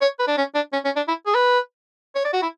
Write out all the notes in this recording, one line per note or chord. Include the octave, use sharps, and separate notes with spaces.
C#5
B4
D4
C#4
D4
C#4
C#4
D4
E4
G#4
B4
C#5
D5
F#4
E4